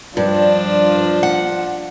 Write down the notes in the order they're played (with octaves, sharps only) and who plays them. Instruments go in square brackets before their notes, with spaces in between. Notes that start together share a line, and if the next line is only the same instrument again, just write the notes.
[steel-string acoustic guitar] G2 [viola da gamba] F3 D4 F4
[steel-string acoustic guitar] F#5